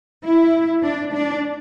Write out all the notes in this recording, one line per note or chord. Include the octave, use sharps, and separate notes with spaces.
E4
D4
D4